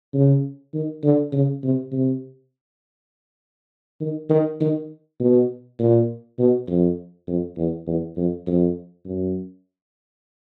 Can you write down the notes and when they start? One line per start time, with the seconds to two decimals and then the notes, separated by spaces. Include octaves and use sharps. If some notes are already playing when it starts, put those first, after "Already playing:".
0.14 C#3
0.74 D#3
1.03 D3
1.33 C#3
1.64 C3
1.92 C3
4.01 D#3
4.30 D#3
4.61 D#3
5.20 B2
5.79 A#2
6.39 B2
6.68 F2
7.27 F2
7.57 E2
7.87 E2
8.17 F2
8.47 F2
9.06 F#2